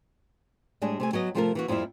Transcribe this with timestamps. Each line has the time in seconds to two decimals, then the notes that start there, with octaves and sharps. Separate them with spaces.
0.82 A2 G3 G#3 D4 G#4
1.00 C3 A3 G#5
1.13 F#3 B3 D#5
1.35 C3 F3 A3 F4 A4 A#4
1.55 E3 A#3 F#4
1.68 F2 F3 G3 A#3 E4